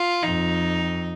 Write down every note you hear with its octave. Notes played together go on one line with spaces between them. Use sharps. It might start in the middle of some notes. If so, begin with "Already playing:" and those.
Already playing: F4
F2 D#4